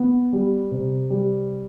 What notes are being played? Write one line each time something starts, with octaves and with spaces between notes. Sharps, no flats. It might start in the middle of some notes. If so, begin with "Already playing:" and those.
Already playing: B3
G3
C3
G3